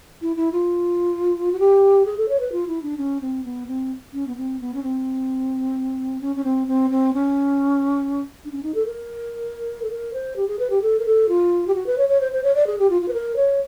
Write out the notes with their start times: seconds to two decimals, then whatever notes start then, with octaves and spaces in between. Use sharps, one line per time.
0.22 E4
0.37 E4
0.52 F4
1.52 F#4
1.59 G4
2.06 G#4
2.17 A4
2.29 C#5
2.40 B4
2.52 F4
2.67 E4
2.82 D4
2.98 C#4
3.21 C4
3.44 B3
3.67 C4
4.13 C#4
4.27 B3
4.37 C4
4.60 B3
4.74 C#4
4.83 C4
6.21 C#4
6.36 C#4
6.44 C4
6.67 C4
6.90 C4
7.14 C#4
8.45 D4
8.52 C#4
8.63 D#4
8.75 A4
8.86 A#4
9.83 A4
9.90 A#4
10.13 C5
10.36 G4
10.48 G#4
10.59 B4
10.70 G4
10.82 A4
10.99 A#4
11.06 A4
11.29 F4
11.68 G4
11.75 F#4
11.87 B4
11.98 C#5
12.09 C#5
12.21 C5
12.32 C5
12.43 C#5
12.55 D5
12.67 G#4
12.79 G4
12.90 F4
13.02 F4
13.08 B4
13.13 A#4
13.36 C#5